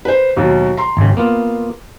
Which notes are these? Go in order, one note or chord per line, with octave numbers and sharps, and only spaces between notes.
B4 C5
D#2 B2 F#3
A#5 C6
G#1 C#3
A#3 B3 F4